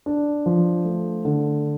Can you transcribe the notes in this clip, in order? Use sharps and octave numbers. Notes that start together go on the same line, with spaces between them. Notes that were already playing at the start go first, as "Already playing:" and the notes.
D4
F3
A3
D3